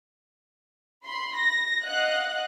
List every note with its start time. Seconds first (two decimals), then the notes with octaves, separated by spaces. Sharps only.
1.05 B5 C6
1.38 A#6
1.85 D#5 F5 F#5 F#6